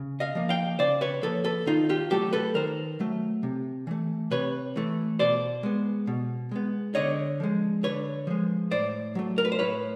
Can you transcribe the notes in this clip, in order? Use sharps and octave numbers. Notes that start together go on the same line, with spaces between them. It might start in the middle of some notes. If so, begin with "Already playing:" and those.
Already playing: C#3
D#5 F5
F3 A#3
F5 G5
C#3 C5 D5
B4 C#5
F3 A#3 A4 B4
A4 B4
D#3 D#4 F4
F4 G4
F#3 A3 G4 A4
A4 B4
D#3 A#4 C5
F#3 A3
C3
E3 A3
C3 B4 C#5
E3 A3
B2 C5 D5
G#3 B3
B2
G#3 B3
D3 C#5 D#5
F3 G#3
D3 B4 C#5
F3 G#3
A2 C5 D5
F#3 A3
A#4
B4
C5
A2 B4 C#5